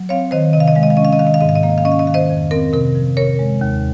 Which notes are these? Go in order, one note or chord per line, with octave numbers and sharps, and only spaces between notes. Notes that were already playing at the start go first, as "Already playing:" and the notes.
Already playing: F#3
C4 C#5 F5
D#3 C5 D#5
C3 D#5
F5
D#5
G#3 F5
D#5
F5
C#4 D#5
F5
D#5
D#3 F5
D#5
F5
G#2 D#5
F5
D#5
A#3 F5
D#5
F5
C#4 D#5
F5
D#5
D#3 F5
C5 D#5
F2
C4 A#4
C3 A#4
F3
C3 A#4 C#5
G#3
D#2